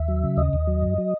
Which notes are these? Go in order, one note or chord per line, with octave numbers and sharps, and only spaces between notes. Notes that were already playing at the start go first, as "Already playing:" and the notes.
Already playing: D#2 E5
F#3
C#3
D#2 D#5
D#2
F#3
F#2
F#3